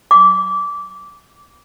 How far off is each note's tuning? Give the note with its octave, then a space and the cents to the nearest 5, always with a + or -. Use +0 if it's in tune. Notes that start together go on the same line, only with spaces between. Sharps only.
D6 -20